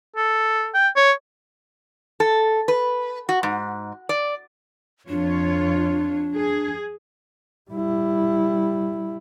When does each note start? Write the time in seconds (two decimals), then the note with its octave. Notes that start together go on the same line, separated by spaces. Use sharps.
0.16 A4
0.74 G5
0.96 C#5
2.20 A4
2.68 B4
3.29 F#4
3.43 G#2
4.09 D5
5.09 F2 D4 F4 C#5
6.36 G#4
7.71 G3 E4